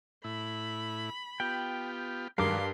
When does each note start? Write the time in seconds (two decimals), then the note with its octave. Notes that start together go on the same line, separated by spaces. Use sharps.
0.24 A2 E4 B5
1.40 B3 F4 G4 G5
2.38 G2 D#3 F#3 G#3 A#4 F5 C6 D6